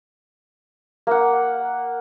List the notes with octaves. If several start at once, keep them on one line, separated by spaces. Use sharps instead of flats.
A#3 F#5